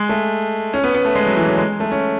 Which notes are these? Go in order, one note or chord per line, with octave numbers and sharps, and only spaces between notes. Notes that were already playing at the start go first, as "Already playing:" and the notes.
Already playing: G#3
A3
C#4
B3
B3
A3
G#3
F#3
E3
F#3
G#3
A3
C#4